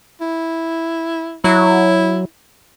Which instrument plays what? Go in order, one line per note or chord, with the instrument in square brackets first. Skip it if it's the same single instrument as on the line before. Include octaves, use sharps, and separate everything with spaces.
[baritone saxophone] E4
[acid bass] F#3 [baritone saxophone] E4